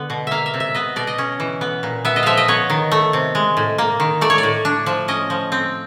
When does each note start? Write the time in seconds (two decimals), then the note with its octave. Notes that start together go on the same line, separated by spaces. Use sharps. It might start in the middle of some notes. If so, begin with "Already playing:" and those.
Already playing: D3 B3
0.10 B2
0.27 A#3 E5 F5
0.46 E5
0.54 C3
0.60 E5
0.75 B3 D#5
0.96 B2 D5
1.07 D#5
1.18 C#4
1.40 E3
1.61 B3
1.83 A#2
2.05 B3 E5
2.16 D#5
2.23 F3 E5 F5
2.37 D#5
2.48 B3 C#5
2.70 D#3
2.92 A3
3.13 C3
3.35 G#3
3.57 A2
3.78 A#3
4.00 D#3
4.21 A3 D5
4.30 C#5
4.38 D5
4.43 A2
4.65 D4
4.86 F3
5.08 C#4 D#5
5.30 F3
5.52 C4